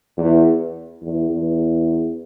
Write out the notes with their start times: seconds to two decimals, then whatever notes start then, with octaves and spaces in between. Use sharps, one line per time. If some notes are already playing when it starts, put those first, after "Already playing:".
0.18 E2
1.02 E2
1.30 E2